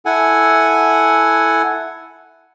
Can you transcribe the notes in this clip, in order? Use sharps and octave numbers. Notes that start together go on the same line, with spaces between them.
E4 A4 F#5 G#5